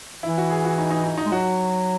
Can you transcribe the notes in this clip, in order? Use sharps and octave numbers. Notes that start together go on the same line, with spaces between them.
E3 E4
F#4
G#4
F#4
D#4
D#4
D#4
D#4
G#3
F#3 F#4